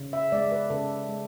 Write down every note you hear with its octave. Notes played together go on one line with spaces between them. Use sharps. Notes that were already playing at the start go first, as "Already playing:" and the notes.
Already playing: C#3
E5
G#3 D5
B4
C#3 A4
G#3